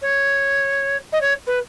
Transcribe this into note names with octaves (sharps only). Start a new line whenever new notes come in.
C#5
D#5
C#5
B4